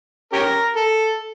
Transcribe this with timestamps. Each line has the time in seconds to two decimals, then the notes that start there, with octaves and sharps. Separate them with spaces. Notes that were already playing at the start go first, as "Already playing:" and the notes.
0.33 C#4 G4 A#4
0.77 A4